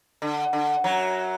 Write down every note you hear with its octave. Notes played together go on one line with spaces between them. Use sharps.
D3
D3
F#2 F#3